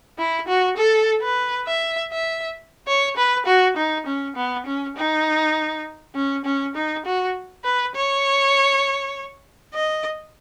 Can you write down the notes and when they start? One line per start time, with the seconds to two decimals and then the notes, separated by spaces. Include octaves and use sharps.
0.18 E4
0.48 F#4
0.77 A4
1.23 B4
1.67 E5
2.12 E5
2.87 C#5
3.16 B4
3.46 F#4
3.77 D#4
4.06 C#4
4.36 B3
4.66 C#4
4.96 D#4
6.15 C#4
6.45 C#4
6.75 D#4
7.05 F#4
7.64 B4
7.95 C#5
9.74 D#5